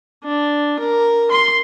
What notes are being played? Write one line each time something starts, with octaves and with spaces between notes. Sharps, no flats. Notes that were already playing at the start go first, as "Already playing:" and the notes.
D4
A#4
C6